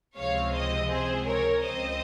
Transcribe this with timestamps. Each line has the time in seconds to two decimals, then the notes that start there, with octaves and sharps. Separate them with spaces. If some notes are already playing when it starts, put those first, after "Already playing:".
0.17 C#2 C3 F3 G#3 C4 C#5 F5
0.53 C5 D#5
0.90 G#4 C5
1.26 A#4 C#5
1.63 C#2 C#3 F3 C4 C5 D#5